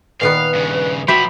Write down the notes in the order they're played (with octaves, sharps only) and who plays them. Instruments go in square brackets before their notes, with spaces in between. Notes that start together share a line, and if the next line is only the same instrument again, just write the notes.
[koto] A#2 D#3 B3 [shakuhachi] B4 [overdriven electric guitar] F5
[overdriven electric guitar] G2 C#3
[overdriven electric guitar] F3 F#3 [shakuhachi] F#4 [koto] G4 E5 [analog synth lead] B5